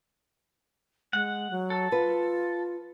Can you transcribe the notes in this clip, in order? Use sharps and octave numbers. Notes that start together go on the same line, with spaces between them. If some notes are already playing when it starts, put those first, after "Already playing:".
G#3 F#5
F#3
A4
F4 B4